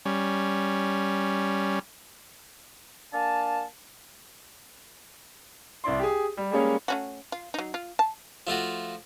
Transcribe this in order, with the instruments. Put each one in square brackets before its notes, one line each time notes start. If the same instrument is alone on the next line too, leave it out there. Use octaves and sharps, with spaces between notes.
[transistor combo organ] G3 C#4
[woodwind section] A#3 D4 F5 G#5 A5
[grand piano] C2 E4 D5 C6
G4 G#4
G3
G3 G#3 A#3 C#4 G#4 C#5
[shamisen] A3 C#4 F#4
F4
F#3 D#4
F4
A5
[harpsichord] F3 A3 F4 F#4